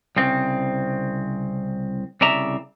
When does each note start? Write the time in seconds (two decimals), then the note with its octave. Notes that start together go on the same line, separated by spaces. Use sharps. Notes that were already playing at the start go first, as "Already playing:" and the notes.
0.16 C2 C#3 C4
2.21 C2 C#3 D5 E5 A#5